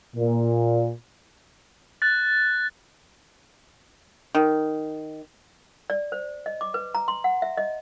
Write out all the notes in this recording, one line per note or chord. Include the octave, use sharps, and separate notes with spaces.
A#2
F#6 A6
D#3
D5
C5
D#5
D6
B4
A#5
C6
F#5
E5
D#5